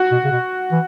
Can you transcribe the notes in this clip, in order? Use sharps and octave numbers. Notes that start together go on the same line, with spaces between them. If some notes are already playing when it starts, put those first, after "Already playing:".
Already playing: F#4
B2
C#3
B2
E3